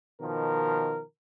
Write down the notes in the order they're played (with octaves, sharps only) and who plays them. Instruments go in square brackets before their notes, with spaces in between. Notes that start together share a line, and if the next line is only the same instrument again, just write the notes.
[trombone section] B2 D#3 F3 A#4